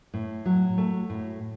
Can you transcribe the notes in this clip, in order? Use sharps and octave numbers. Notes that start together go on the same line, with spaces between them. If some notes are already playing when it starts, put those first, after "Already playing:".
A2
F#3
A3
A2